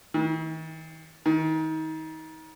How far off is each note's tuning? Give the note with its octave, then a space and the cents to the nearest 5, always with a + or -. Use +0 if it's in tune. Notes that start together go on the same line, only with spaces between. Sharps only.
D#3 +45
D#3 +30